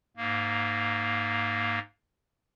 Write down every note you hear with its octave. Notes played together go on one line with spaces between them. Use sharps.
G#2 A#3